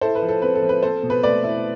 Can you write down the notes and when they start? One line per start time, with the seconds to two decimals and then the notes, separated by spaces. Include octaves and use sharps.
0.01 E4 A4 C5
0.15 B4
0.22 F3
0.29 A4
0.42 C4 B4
0.55 A4
0.62 F3
0.69 B4
0.83 C4 A4 C5
1.03 B2
1.10 B4
1.23 A3 B4 D5
1.44 E4